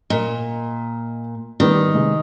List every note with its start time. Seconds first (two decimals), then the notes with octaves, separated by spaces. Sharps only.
0.10 A#2 A#4 D#5
1.60 D#3 G3 B3 G4
1.94 C3 G#3